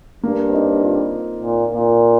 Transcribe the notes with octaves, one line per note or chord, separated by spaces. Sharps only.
G2 A#3
C4
D#4
F4
A#2
A#2